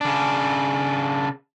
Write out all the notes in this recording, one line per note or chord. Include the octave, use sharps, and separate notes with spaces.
C#3 D4